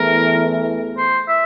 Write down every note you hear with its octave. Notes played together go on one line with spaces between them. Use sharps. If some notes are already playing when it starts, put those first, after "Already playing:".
Already playing: E2 E3 A3 A#4
C5
E5